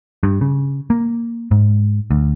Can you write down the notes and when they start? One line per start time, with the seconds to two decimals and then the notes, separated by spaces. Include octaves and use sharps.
0.23 G2
0.41 C#3
0.90 A#3
1.51 G#2
2.11 D2